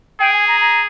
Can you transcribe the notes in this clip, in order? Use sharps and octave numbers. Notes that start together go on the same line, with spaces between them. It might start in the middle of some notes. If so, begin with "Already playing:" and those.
G#4 G5
G#5
A#5
A#5